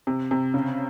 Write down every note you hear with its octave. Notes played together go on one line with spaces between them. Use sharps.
C3
C3
C#3